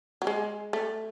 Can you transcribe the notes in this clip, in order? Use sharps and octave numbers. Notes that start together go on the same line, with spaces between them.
F#3
G#3
A3